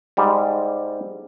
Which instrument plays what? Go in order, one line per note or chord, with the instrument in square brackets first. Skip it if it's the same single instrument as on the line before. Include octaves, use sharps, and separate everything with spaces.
[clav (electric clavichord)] G#2 G3